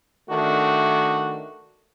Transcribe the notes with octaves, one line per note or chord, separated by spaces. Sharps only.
D#3 A3 D4 F#4